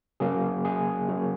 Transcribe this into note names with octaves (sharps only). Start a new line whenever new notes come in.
C#3 F#3 A#3 G#4
G#4
C#3 F#3 A#3 F#4